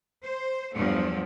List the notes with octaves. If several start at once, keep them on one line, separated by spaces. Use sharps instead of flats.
C5
E2 G2 F3 F#3 A3